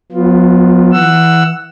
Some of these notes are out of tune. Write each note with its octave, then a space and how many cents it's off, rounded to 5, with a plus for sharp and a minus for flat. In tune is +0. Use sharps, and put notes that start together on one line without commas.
F#3 -45 B3 +0 F4 +0
E3 -5 F#5 +0 E6 +10